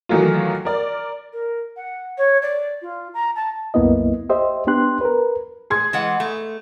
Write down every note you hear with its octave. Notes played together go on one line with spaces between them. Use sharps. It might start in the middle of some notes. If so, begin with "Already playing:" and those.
D#3 E3 F#3 A3 F4
A#4 D5
A#4
F#5
C#5
D5
F4
A#5
A5
C2 F#2 A#3 B3 E4 D#5
G4 C5 D#5 E5
B3 D4 G4 C6 F#6
A#4 B4
G#4 C6 G#6
E3 G#3 F#5
A3